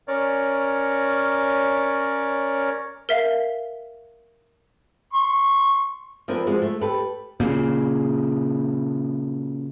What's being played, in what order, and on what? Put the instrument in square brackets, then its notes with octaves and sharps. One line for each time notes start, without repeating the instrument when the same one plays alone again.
[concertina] C#4 A#4 C#5 D5
[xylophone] A#4 E5 F5
[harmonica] C6 C#6
[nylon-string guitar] F3 C4 D4 A#4 B4 G#5
F3 G#3 F#4 C5
A3
G4 A4 B4
[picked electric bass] A#2 C#3